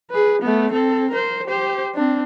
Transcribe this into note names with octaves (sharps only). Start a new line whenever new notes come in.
G#4 B4
A3 B3
C4 A4
A#4 C5
G4 C5
C4 D4